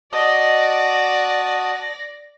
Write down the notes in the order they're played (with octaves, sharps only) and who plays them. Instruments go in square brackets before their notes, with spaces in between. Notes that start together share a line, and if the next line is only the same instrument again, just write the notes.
[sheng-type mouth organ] F#4 A5 D#6 [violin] D5 A#6 [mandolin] D#5